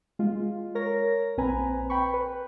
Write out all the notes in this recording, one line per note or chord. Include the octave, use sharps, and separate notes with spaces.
G#3 F4
A#4 C#5 A#6
A#1 C4 B4 G#5 A#5
G5 B5 C#6
B4